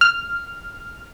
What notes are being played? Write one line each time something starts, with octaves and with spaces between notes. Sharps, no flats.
F6